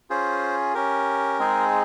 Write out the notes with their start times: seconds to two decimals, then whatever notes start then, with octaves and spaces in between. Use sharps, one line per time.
0.10 C#4 F4 G#4 C5
0.74 C#4 G4 A#4
1.39 G#3 C4 D#4 G#4